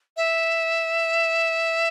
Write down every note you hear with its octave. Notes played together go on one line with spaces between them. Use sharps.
E5